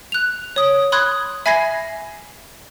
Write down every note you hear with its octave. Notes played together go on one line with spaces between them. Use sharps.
F#6 F7
C#5 D#6
B5 C6 D#6 F#6 G#6
E5 G#5 B5 G#6 A#6 C7